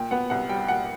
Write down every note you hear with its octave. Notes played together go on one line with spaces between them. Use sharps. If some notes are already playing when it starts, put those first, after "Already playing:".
Already playing: A#2 G5
B3 F#5
C2 F#5
G3 G5
A#2 F#5